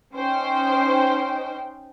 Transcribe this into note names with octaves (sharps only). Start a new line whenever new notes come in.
C#4 D#4 C5 G5